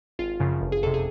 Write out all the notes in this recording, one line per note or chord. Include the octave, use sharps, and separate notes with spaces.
G#1 F4
F#2 C#3 F3
G1
G#4
F2 C3 A4
G#4